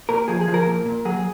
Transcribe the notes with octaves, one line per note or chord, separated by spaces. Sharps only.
A#2 A#4
F3 G#4
G#4
F3
A#4
A#2
A#2
F#3 G#4